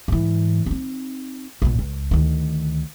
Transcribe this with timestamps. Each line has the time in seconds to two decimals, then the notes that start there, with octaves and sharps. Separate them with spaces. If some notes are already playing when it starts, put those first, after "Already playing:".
0.08 G#2 E3
0.66 C4 D#4
1.62 A#1 A#2
1.79 C#2
2.11 D2 D#3